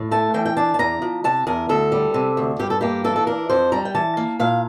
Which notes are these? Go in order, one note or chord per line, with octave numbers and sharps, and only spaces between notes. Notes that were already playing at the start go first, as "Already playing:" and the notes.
Already playing: A2
A3 A5
E3 G5
G5
D4 A5
A5
E2 A#5
F3
C3 A5
E2 A#4
D2 A4
G3
C3
D2
G2 G4
A4
A#3 G4
E3 A4
A4
D4 A#4
F2 C5
G3 A#5
G5
E3 A5
A#3
A#2 F5